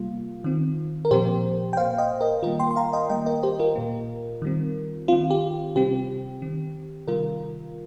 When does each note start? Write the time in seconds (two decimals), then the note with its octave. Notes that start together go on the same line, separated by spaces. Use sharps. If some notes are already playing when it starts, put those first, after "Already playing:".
Already playing: C3 G3 A#3 F4
0.44 D#3 C4
1.05 A#4
1.11 A#2 F3 C4 G4 C5
1.73 G5
1.76 A#2 A#3 C5 F5
1.98 D#5 G5
2.21 A#4 D#5
2.43 D#3 G3 A#3 F4 A#4
2.59 G5 C6
2.71 C6
2.76 F5 A#5
2.93 D#5 G5
3.10 D#3 G3 A#3 D#5 G5
3.26 A#4 D#5
3.43 G4 C5
3.59 F4 A#4
3.75 A#2 A#3
4.42 D#3 G3 C4
5.08 D#3 C4 F4
5.31 G4
5.76 C3 G3 C4 G4
6.42 D#3 C4
7.08 C3 D#3 G3 F4 A#4